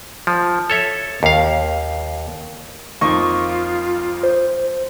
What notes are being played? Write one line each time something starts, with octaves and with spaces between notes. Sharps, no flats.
F3
A4 C#5 E5
D#2 F5
F2 A#3 D#4 F4 C#6
C5